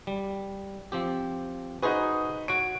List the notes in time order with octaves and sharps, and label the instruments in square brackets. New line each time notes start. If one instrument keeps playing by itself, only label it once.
[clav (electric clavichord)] G3
F3 C4 G4
[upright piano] D#4 B4 [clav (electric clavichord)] F#4 G#4 C5
[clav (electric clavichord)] F#4 C#5 [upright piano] D7